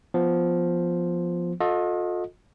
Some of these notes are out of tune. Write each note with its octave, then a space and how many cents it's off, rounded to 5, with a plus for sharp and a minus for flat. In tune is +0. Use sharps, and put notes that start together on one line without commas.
F3 +0 B3 +0 C5 +0
F4 +40 A4 +0 D#5 +0